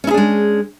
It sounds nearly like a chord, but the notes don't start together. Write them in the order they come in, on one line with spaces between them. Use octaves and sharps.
C#4 E4 G#4 D4 G#3